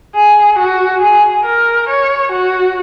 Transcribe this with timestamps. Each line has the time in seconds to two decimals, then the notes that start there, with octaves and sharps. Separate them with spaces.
0.15 G#4
0.59 F#4
1.02 G#4
1.45 A#4
1.89 C#5
2.32 F#4